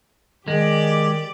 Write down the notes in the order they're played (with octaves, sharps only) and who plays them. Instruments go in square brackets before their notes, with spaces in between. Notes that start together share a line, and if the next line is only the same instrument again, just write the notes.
[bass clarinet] D#3 [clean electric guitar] G#3 [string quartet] G4 D5